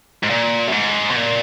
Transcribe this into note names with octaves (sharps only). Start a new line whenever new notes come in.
G#2
A#2
F#2
G#2
B2
A#2